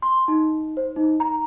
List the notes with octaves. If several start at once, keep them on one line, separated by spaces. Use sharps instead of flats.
C6
D#4
C5
D#4
A#5